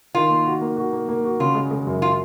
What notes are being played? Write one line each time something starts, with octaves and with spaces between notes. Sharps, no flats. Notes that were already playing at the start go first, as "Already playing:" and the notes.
D#3 F4
A#3
F#4
A#3
F#4
A#3
A#3
F#4
C#3 F4
G#3
G#3
F#2
F4